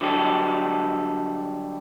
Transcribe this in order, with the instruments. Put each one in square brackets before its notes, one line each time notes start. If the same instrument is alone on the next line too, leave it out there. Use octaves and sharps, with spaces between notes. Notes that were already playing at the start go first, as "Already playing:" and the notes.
[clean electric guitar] D3 F#3 G3 A4